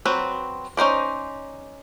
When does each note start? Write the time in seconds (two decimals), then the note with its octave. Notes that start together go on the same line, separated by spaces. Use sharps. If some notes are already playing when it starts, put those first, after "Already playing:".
0.05 F#3 C4 B4
0.77 C#4 D#4 C5 D5